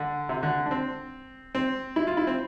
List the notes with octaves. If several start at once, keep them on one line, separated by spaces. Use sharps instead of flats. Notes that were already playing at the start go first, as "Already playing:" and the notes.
Already playing: D3
C3
D3
D4
C4
C4
E4
F4
E4
C4